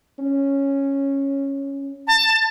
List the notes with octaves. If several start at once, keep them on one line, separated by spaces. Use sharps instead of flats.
C#4
A5